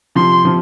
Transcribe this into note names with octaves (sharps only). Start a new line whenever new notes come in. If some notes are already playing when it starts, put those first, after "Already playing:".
C3 F3 C6
C3 F3